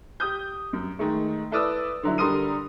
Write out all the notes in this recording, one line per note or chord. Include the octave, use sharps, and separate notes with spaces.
G4 D#6 G6
F#2
D#3 G#3 A3
E4 A4 B4 D5 D#6 E6
D3 F#3 E4
D3 G3 A#4 C6 D#6 D#7